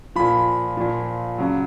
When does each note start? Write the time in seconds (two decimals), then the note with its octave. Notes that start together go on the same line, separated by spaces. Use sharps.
0.16 A#2 F3 B5
0.77 A#2 F3
1.38 C#3 F#3